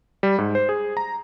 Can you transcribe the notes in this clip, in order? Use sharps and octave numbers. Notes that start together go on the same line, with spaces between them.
G3
G#2
C5
G#4
A#5